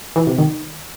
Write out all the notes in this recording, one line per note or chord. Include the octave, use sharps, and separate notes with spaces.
E3
C3
D#3